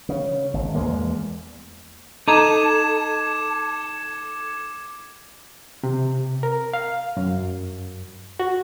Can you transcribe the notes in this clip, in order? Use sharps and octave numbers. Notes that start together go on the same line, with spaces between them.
C#3
G#1
E2 G#3 A#3
D#4 A4 D#5 A#5 D6 G#6 E7
C3
A#4
F5
F#2
F#4